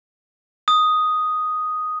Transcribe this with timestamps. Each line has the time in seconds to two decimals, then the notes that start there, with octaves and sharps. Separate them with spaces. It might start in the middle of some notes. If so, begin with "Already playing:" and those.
0.68 D#6